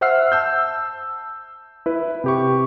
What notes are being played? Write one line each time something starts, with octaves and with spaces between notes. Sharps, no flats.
C5 E5 F#5 E6 F6 C7
A5 E6 G6
E4 B4
C3 G4 C#6